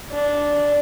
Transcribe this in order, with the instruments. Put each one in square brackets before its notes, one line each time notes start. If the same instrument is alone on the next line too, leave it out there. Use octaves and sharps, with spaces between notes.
[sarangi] D4